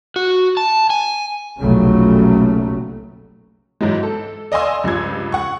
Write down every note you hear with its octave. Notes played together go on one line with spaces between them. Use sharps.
F#4
A5
G#5
F1 B1 A#2 C#3 F#3 A3
G#2 E3 F#3 G#3
A4
D5 D#5 F5 G#5 C6 E6
C#2 G2 F3 G#6
F#5 C#6